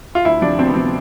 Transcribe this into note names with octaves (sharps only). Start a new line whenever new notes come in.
F4
D2 E4
C3 F3 D4
D2 C4
B3
C3 F3 C4